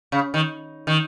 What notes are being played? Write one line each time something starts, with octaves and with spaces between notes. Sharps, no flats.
C#3
D#3
D#3